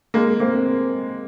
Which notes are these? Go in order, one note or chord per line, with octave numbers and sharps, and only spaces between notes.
G#3 A#3
A#3 C4